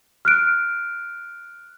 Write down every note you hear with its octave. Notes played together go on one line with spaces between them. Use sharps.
F6 F#6 D7